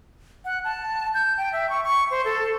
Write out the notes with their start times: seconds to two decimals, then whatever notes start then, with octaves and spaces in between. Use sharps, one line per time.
0.45 F#5
0.64 A5
1.14 G6
1.37 G5
1.53 E5
1.70 C#6
1.83 C#6
2.11 C5
2.25 A4